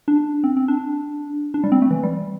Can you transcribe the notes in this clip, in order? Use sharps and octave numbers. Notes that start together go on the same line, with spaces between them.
D4
C4
C4
D4
D4
G3
C4
A3
E3
G3